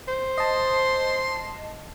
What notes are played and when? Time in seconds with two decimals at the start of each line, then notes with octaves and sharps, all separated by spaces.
0.08 C5
0.38 D#5 A5 C6